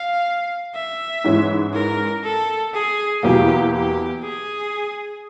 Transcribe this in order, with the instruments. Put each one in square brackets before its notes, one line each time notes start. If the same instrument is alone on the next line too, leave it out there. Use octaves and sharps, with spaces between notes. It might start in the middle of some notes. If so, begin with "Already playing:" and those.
Already playing: [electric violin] F5
E5
[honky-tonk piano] G#2 E3 G#3 C#4
[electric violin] A#4
A4
G#4
[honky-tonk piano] E2 B2 F#3 A#3 [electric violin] G4
[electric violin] G4
G#4